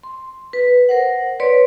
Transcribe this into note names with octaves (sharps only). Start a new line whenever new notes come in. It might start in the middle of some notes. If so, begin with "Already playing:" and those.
C6
B4
A#4 C5 F#5
B4 C#5 D5 C6